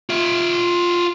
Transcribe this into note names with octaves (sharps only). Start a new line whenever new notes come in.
F4 E5